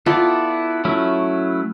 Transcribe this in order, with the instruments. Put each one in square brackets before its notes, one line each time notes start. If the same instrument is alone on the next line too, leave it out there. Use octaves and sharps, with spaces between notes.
[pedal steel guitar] B3 E4 A4 D5 [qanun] F4
[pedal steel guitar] F#3 A3 C#4 E4